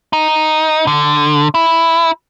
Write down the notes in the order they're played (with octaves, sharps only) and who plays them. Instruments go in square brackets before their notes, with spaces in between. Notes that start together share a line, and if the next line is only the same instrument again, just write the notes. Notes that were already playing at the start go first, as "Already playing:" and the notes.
[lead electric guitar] D#4
D3
E4